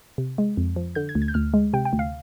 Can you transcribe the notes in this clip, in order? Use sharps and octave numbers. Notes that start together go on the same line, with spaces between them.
C3
G#3
F2
F3
D3 G6
G#6
D2
G#6
G6
D2 F6
G#3
C3 G5
G5
D2
F5